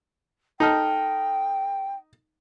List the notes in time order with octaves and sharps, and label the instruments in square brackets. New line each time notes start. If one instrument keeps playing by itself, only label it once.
[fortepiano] D#4 [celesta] A4 A5 F6 [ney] G5